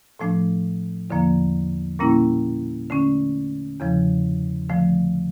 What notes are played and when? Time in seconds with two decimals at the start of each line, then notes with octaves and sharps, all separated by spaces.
0.19 A2 F3 A3 D4
1.10 E2 D3 F3 A#3
1.99 A#2 G3 A#3 C#4 E4
2.90 D3 A3 C#4
3.80 E2 C#3 F3
4.69 D3 F3 A3